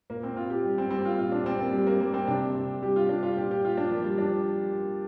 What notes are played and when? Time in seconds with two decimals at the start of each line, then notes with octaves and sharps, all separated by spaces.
0.10 A#2 A#3
0.23 C4
0.36 A#2 F4
0.50 G4
0.64 G3
0.78 C4
0.90 G3 C4
1.05 F4
1.18 A#2 F4
1.32 D4
1.46 A#2 C4
1.59 A#3
1.73 G3
1.87 A#3
2.00 G3 A#3
2.14 C4
2.27 C3 D4
2.55 C3
2.82 G3 G4
2.96 F4
3.09 G3 D4
3.23 F4
3.36 A#2 G4
3.51 G4
3.64 A#2 F4
3.77 D4
3.91 F3 A#3
4.04 G3
4.18 F3 D4